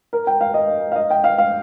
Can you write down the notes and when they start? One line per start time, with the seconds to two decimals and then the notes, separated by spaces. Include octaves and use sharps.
0.13 A#4
0.27 G5
0.41 F5
0.54 D#5
0.92 F5
0.96 D#5
1.10 G5
1.24 F5
1.38 F5